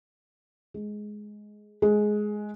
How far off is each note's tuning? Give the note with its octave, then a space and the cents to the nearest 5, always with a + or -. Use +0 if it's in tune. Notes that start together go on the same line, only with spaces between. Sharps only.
G#3 +10
G#3 +10